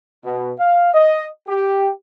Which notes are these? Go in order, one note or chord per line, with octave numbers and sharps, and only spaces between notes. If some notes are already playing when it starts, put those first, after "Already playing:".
B2
F5
D#5
G4